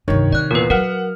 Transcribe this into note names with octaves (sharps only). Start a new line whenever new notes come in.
C2 G2 D#3 C#5
C3 D5 F#6
E2 A#2 A#4 B4
F#3 A#4 F5 F#5 F6